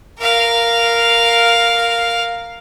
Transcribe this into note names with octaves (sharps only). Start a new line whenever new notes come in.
A#4 F5